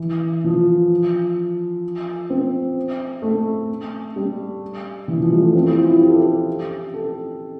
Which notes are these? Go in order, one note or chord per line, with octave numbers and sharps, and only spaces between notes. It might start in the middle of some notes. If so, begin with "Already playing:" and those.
Already playing: E3
F3
C4
A3
G3
E3
F3
G3
A3
C4
E4
F4
E4
G4
A4
G4
A4